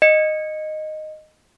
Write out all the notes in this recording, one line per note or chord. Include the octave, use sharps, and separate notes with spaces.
D#5 C#7